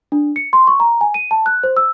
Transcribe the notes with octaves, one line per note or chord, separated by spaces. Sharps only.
D4
C#7
C6
C#6
A#5
G#5
D#7
A5
F#6
C5
E6